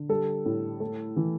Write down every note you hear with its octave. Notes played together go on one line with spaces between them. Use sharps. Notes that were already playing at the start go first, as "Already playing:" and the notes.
Already playing: D3
G3 A4
A2
A3
E3